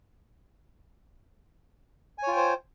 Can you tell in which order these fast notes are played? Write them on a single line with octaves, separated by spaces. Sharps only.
G#5 C#5 F4 G5 C5